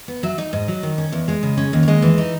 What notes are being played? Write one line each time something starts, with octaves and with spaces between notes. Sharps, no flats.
B3
F#3 E5
D#4 D#5
G#2
F#3
D#3
C#4
E2
G#3 D#5
C#3
C#4
D#2
C#5
G#3 D#5
E3
D#4